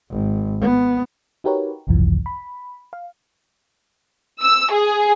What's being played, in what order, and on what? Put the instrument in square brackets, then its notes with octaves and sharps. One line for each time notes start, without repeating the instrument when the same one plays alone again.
[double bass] G#1
B3
[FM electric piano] D#4 F#4 G4 A#4 B4 C#5
G#1 C#2 F#2 C3 E3 F3
B5
F5
[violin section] E6
G#4